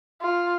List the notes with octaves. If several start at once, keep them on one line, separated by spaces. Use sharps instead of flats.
F4